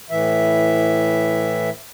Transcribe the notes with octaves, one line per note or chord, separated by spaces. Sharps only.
A2 E3 E5